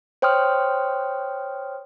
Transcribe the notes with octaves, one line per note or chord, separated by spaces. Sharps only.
C5 C#5 G5 C6 D#6 F6